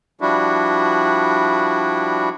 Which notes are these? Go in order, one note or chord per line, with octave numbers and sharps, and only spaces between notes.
F3 G3 D4 E4 F#4